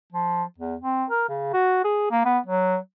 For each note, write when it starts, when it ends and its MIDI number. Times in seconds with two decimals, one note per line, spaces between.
0.12 0.43 53
0.58 0.75 40
0.81 1.04 60
1.10 1.25 70
1.29 1.49 49
1.53 1.80 66
1.84 2.11 68
2.11 2.22 58
2.25 2.38 59
2.46 2.77 54